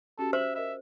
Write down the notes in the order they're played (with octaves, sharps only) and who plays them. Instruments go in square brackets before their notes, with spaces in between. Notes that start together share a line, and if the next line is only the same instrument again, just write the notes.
[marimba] C#4 F#4 G4 [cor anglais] A4
[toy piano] C5 [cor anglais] E5
[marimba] A#4 D#5 [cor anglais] E5